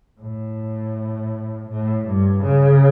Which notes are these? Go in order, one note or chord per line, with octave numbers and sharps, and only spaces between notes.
A2
A2
G2
C#3